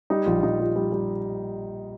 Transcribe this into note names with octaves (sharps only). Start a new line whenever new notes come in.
G3 D#4
A#1 F4
A#1 D#4
G3 F4
G3
G3